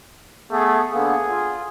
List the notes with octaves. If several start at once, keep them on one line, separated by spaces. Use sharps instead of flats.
A3 B3 G#4
D3 A#3 B3 G#4
F4